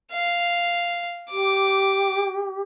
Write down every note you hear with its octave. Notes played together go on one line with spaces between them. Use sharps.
F5
G4 D6